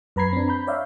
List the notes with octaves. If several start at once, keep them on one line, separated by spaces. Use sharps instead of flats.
F#2 B4 A#5 B5 G#6 C7
C4 D4
A#5 B5 G6
C#5 D5 E5 F5